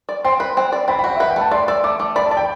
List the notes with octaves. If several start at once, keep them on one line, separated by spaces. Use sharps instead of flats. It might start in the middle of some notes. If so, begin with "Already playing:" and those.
D5
C4 C6
B4
C4
D5
C4 B5
B5
F#4
G5
E5
B4 F#5
G5
A3
A5
D5 C6
D5 E6
A3 D6
A3 D6
D5 B5
A5
D5
G5